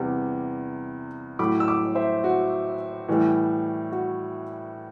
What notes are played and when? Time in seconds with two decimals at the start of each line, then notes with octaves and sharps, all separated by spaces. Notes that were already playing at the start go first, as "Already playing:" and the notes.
Already playing: E2 C3 G3
1.39 A2 F#3 B5 D6
1.60 E6
1.68 B5 D6
1.95 C5 E5
2.24 F#4
3.08 A2 E3 G3
3.92 F#4